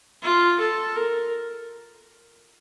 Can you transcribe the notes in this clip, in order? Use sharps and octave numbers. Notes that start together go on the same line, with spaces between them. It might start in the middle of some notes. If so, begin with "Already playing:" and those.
F4
A4
A#4